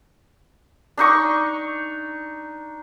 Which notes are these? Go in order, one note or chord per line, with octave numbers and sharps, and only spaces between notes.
D4 D#4 C#6